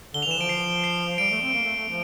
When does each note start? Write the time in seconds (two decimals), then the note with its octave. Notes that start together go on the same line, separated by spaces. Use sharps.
0.14 D3 G7
0.22 F7
0.26 E3
0.31 E7
0.37 F3 D7
0.49 C7
0.84 C7
1.18 G3 D7
1.31 A3
1.42 C4
1.54 A#3
1.65 A3
1.76 A3
1.89 F3